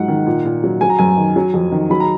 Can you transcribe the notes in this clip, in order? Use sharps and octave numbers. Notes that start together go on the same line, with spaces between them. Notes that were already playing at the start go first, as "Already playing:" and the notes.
Already playing: G#2 F3 F#3 F#5
D#3
A#2
A#2
F#3
F#3 G#5
A#5
F#2 G#5
D#3
F#3
F2
D#3
F#3 B5
A#5